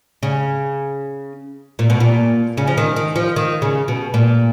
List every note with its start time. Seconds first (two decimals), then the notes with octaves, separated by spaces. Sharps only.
0.23 C#3
1.79 A#2
1.90 B2
2.00 A#2
2.57 C#3
2.67 F3
2.77 D#3
2.96 D#3
3.16 F3
3.36 D#3
3.62 C#3
3.88 B2
4.14 A#2